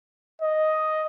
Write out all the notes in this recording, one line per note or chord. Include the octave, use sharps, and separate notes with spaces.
D#5